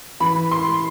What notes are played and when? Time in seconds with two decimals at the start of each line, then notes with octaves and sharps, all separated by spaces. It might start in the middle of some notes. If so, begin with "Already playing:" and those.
0.20 E3 B5
0.51 C6